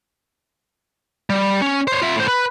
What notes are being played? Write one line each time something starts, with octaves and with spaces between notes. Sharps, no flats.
G3
C#4
C5 C#5
F4 E5
A2 C5
B4